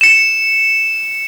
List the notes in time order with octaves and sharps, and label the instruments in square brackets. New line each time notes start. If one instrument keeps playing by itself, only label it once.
[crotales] C#7 E7